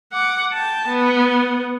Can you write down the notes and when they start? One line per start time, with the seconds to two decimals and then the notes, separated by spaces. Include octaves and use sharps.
0.13 F#5 D6
0.53 G5 A5
0.87 B3